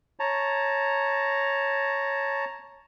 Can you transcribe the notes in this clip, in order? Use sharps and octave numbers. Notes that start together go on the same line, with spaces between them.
C#5 A5 A#5